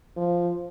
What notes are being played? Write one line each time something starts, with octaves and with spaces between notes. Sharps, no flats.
F3